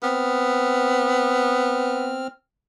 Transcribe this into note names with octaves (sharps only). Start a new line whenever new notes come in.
B3 C4 F6